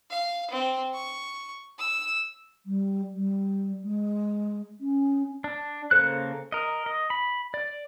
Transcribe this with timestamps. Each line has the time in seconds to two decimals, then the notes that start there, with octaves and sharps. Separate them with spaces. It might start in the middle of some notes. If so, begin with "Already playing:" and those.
0.11 F5
0.50 C4
0.94 C#6
1.78 E6
2.66 G3
3.15 G3
3.84 G#3
4.81 C#4
5.44 D4
5.91 C#3 A#3 A4 C5 F#6
6.52 A#4 D#5
6.86 D#5
7.10 B5
7.54 D5